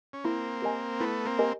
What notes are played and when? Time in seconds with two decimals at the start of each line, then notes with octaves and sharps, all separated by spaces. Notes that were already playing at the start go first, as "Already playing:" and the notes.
0.13 C#4
0.24 A#3 C4 E4
0.62 G4 A#4 D#5 G#5
1.00 A3 B3 E4
1.25 A#3 C4
1.39 G4 A#4 D#5 G#5